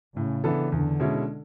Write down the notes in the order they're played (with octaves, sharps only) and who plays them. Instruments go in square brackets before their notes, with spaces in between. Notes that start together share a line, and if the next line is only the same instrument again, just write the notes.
[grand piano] A2 [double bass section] C#3
[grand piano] E3 B3 D4 A4
[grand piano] E2 [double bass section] D3
[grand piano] B2 G#3 C#4 E4